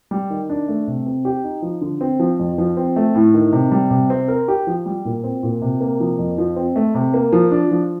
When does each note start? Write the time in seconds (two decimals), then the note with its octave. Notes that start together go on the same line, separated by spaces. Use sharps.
0.11 G3
0.30 D#3
0.49 D4
0.68 A3
0.87 C3
1.06 C4
1.25 G4
1.44 D#4
1.62 F3
1.81 D3
2.01 C4
2.20 F3
2.39 F2
2.58 F3
2.77 C4
2.96 A3
3.15 A2
3.34 D#3
3.53 C3
3.71 G3
3.91 C3
4.10 C4
4.28 A#4
4.48 G4
4.67 F3
4.86 G3
5.05 A#2
5.24 C4
5.43 A#2
5.62 C3
5.81 A#3
6.00 F3
6.18 F2
6.38 F3
6.56 C4
6.76 A3
6.95 C3
7.14 A#3
7.32 F3
7.51 D4
7.71 F3